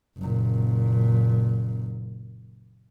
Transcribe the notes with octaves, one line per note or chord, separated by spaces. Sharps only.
F#1 A#2